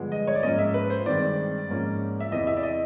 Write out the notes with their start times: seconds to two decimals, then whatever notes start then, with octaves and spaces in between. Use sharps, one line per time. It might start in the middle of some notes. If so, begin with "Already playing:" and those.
Already playing: G2 D3 F3 G#3 B3
0.12 D#5
0.27 C#5
0.35 D5
0.43 G#2 F3 A#3 C#4 D#5
0.59 E5
0.74 B4
0.90 C5
1.06 G2 D#3 G#3 C4 D5
1.69 G#2 F3 A#3 C#4
2.20 E5
2.32 E2 C3 E3 D#5
2.47 E5
2.57 D5
2.63 D#5